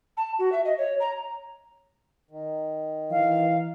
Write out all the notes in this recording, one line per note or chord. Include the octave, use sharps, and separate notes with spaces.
A5
F#4
E5
D#5
C#5
A#5
D#3
E3 F5